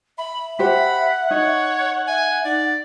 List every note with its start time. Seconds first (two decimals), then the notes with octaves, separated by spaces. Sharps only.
0.18 E5 B5
0.59 G4 C5 F#5 B5
1.31 D#4 C#5
2.08 E5 G#5
2.45 D#4 D5